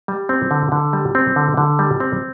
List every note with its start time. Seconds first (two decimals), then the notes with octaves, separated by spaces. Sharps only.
0.08 G3
0.29 C4
0.51 D3
0.72 D3
0.93 G3
1.15 C4
1.36 D3
1.57 D3
1.79 G3
2.00 C4